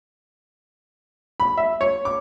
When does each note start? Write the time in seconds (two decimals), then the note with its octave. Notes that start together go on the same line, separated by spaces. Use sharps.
1.40 B5
1.57 E5
1.81 C#5
2.05 D6